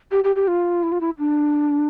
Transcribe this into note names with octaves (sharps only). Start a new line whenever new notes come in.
G4
G4
G4
F4
E4
F4
E4
D4